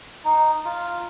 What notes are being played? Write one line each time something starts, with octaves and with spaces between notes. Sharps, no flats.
D#4
F4